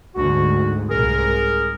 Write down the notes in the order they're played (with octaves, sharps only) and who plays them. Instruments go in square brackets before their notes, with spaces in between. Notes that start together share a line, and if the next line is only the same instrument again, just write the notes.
[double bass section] D2 G#2 [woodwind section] F#4
[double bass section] C2 G#2 [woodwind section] G#4 A#4